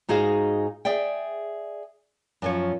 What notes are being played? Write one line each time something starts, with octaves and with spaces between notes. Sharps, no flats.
G#2 D#4 F#4 G#4 F5
G#4 D5 E5 G5
F#2 F3 C#5